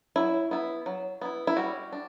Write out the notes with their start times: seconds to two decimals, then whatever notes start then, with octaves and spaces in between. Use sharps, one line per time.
0.16 F#3 E4
0.51 B3 E4
0.86 F#3
1.21 B3 E4
1.47 E4
1.57 G3 F#4
1.93 D4